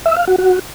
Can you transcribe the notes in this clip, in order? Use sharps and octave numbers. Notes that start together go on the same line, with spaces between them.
E5
F5
F#4
F#4